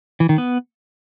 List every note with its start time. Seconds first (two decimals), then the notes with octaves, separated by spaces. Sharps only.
0.20 E3
0.29 D#3
0.38 B3